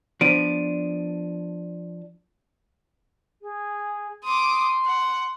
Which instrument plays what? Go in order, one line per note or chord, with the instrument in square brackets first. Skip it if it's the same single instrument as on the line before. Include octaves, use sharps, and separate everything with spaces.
[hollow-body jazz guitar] F3 B3 D4 [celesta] D7 D#7
[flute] G#4
[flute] C6 [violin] D6 D#6
[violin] F#5